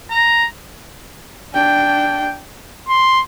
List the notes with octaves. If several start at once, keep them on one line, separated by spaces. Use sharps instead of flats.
A#5
D4 G5
C6